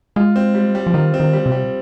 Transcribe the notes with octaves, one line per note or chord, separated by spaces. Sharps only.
G#3 F4
C4
G3
G3
F3
D#3 F4
C4
D#3
G3
C3
G3